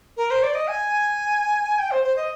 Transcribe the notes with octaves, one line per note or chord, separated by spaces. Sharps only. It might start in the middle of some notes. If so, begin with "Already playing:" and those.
A#4
C5
D5
D#5
G#5
G5
C5
C5
D#5